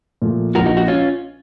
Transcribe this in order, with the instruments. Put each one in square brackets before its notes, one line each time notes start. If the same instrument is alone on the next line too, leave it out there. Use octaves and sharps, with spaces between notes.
[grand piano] A#2 F3 A3
[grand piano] A#1 A#2 F3 [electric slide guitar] F#4 A#4
[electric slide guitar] D#4 F#4
D#4 F#4
C#4 F4